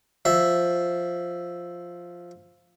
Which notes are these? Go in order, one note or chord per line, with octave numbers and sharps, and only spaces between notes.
F3 E5